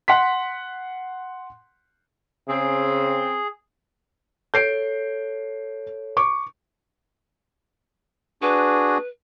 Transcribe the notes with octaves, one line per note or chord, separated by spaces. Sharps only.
F#5 C6 B6
C#3 C4 G#4
A4 C#5 G6 C7 D7
C#6 D6
D4 F#4 G#4 B4